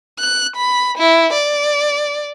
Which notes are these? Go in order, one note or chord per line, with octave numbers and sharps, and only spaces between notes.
F#6
B5
E4
D5